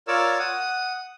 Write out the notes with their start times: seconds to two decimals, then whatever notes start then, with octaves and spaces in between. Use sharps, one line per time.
0.08 F4 A#4 C#5 D5 E6
0.39 F#5 D#6